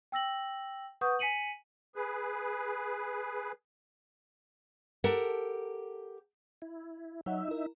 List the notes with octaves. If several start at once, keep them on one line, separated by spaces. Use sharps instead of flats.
G5 E6 A#6 F#7
B4 F#5 C#6 D#6 G6
G#5 B6 C#7 D#7 F#7
G#4 B4
G4 A4 A#4 F#5 A5
E4
F#3 D#4 C#5 E5 F#5
E4 A#4